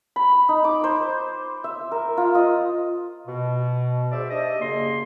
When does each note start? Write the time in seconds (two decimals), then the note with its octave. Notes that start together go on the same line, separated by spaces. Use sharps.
0.16 B5
0.49 D#4
0.64 D6
0.84 C5
1.64 E5
1.92 A#4
2.17 F4
2.35 D#5
3.28 B2
4.11 G#2 C5 D5 E5
4.30 D4 G4 D#5
4.60 F#2 C#3 A#3 C6